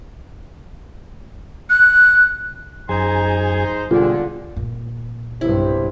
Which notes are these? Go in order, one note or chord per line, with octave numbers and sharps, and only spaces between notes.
F#6
F#2 D#4 G#4 C5 G#5
B2 D3 G3 F4 G#4
A#2
B1 G2 C3 E4 G4 C5